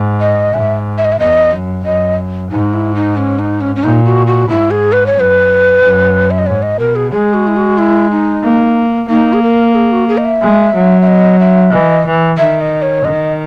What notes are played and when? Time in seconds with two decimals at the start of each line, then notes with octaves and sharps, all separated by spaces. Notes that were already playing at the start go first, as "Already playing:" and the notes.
Already playing: G#2
0.21 D#5
0.53 G#2 E5
0.98 E5
1.05 D#5
1.12 E5
1.20 E2 D#5
1.52 F#2
1.85 F#2 D#5
2.51 G#2 D#4
2.73 E4
2.95 D#4
3.17 C#4
3.39 D#4
3.61 C#4
3.76 C#4
3.83 A#2 D#4
4.05 F#4
4.27 F#4
4.49 G#2 E4
4.71 G#4
4.92 B4
5.06 C#5
5.15 F#2 B4
5.81 F#2
6.31 E5
6.39 D#5
6.46 G#2 C#5
6.62 D#5
6.79 B2 A#4
6.96 G#4
7.12 G#3 G#4
7.34 F#4
7.48 E4
7.56 F#4
7.78 E4
8.11 D#4
8.44 A#3
9.09 A#3 D#4
9.33 G#4
9.42 A#4
9.75 G#4
9.92 F#4
10.08 G#4
10.17 D#5
10.25 E5
10.42 G#3
10.74 F#3
11.02 E5
11.07 D#5
11.40 E5
11.72 E3 D#5
12.06 E3
12.38 D#3 E5
12.61 D#5
12.82 C#5
13.04 D#3 D#5